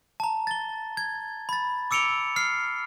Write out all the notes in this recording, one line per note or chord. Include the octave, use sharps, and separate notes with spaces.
A5 A#5
A6 G7
G#6
B5 A6
D6 E6 C#7 D7 F7 G7
F6 C7